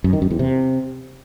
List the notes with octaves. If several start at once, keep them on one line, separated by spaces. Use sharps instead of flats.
F#2
D#3
F#2
E2
C3